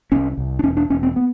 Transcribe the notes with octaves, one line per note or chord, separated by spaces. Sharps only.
C2 C#4
C2
D4
E1 C#4
D4
E1 C#4
C4
B3